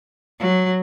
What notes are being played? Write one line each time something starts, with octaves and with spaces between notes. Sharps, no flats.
F#3